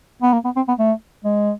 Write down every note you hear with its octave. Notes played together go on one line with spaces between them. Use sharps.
B3
A#3
B3
C4
B3
A3
G#3